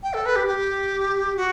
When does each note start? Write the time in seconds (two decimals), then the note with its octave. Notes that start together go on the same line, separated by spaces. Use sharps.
0.03 G5
0.14 A4
0.26 B4
0.36 G4
0.47 G4
1.37 F#4